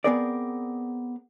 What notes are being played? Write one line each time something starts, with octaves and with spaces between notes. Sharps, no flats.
B3 C4 G#4 A#4 D5